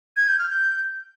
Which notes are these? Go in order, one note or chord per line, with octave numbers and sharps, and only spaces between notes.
G#6
G6
F6
G6